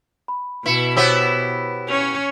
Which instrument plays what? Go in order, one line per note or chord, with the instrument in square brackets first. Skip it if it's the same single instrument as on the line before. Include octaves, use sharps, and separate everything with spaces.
[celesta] B5
[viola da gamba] B2 [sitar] E4 [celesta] B4 C#7 E7
[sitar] B3 E4 G4 [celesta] C5 C#5 E6
[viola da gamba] C#4 C#5 [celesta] F7